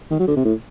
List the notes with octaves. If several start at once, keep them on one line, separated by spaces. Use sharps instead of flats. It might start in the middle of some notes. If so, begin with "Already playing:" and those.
D#3
F#3
D3
C3
A2